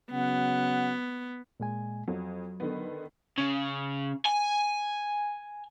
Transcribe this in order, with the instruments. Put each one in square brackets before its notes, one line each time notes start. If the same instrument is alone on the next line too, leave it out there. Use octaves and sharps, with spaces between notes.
[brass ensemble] C#3 F#3 F#5 [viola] B3
[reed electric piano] A#2 G#3 G#5
[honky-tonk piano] F2 [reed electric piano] F#3
[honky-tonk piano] D3 D#3 B3
[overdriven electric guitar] C#3
G#5